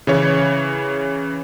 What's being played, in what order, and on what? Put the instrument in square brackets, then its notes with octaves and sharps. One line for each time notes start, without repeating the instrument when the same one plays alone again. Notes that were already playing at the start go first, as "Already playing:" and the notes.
[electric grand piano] C#3 E3 C#5